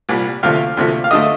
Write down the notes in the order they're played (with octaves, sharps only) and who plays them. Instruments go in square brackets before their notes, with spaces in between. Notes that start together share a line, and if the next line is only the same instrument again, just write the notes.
[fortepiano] C2 A#2 G3
D2 C3 F3 A3 F5
D2 C3 F3 A3
F5
D2 D3 A3 D#5